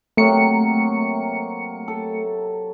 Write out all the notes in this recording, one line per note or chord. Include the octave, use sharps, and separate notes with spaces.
C3 F#3 A3 A#3 C#7
A4